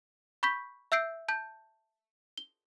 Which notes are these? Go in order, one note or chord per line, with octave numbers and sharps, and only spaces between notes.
B5 C#6 G6 B6
E5 E6 G6 C7 D7
A5 G6
G7